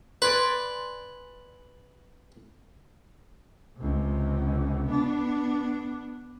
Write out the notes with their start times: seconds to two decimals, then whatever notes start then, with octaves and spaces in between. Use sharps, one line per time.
0.22 B4 D5 G#5 C6
3.77 C#2 C3
4.87 B3 D4